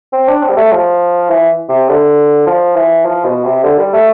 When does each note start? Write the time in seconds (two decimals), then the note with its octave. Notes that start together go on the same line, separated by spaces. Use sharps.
0.13 C4
0.28 D4
0.43 C4
0.49 G3
0.57 A3
0.72 F3
1.30 E3
1.69 C3
1.89 D3
2.46 F3
2.76 E3
3.05 F3
3.25 B2
3.44 C3
3.63 D3
3.78 G3
3.93 A3